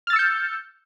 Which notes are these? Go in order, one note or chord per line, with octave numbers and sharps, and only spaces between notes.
E6 F6 G6 A6 C#7